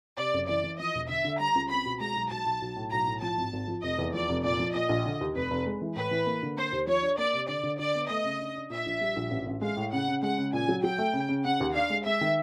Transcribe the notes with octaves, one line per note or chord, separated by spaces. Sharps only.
C3 D5
F#1
E3 D5
E3
F3 D#5
E1
D3 E5
D3
G3 A#5
C#2
C4 B5
B2
G#3 A#5
B1
B1 A5
B1
B1
A2
B1 A#5
A2
F3 A5
G#1
G#1
F3
F1 D#5
E2
F3 D5
F1
A#2 D5
F3
A#2 D#5
A#1
D3
D#2
F1 B4
F1
G#3
E3
A2 B4
E3
A#3
D3
A#3 C5
D#2
F3 C#5
D4
A#3 D5
C3
D3 D5
D3
D3 D5
B3
A3 D#5
C#3
D4
D4
A#2 E5
A#1
G3
A#1
A1
A1
G#3 F5
A2
C#3 F#5
C#3
G#3 F#5
C#3
A#2 G#5
F#3
F#3 G5
A3
C#3
C#3
C#3 F#5
D#2
D4 F5
G#3
G#3 E5
D#3